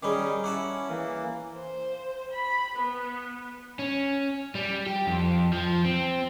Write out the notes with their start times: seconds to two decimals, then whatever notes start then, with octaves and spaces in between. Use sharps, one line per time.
0.03 D#3 G3 C#4 D#4 G#4 B5 D6
0.44 C#4 E4 F#5 A5 D6
0.89 E3 A#3
1.55 C5
2.31 B5
2.76 B3
3.79 C#4
4.55 G3
4.86 G4
5.07 F2
5.53 F3
5.85 C4